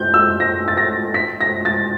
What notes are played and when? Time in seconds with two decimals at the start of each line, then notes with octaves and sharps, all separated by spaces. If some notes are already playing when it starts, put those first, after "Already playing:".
Already playing: G6
0.14 E6
0.40 A#6
0.68 A6
0.77 A#6
1.14 B6
1.41 A#6
1.65 A6